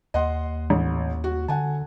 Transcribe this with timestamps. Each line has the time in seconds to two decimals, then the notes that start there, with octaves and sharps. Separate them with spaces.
0.14 D#2 D#5 F#5 C6
0.70 A1
1.24 F#4
1.48 D3 F#5 G#5 A5